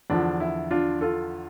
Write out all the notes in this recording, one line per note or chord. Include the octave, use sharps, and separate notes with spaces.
E2 D3 F3 D4
E4
D4 F4
F4 A4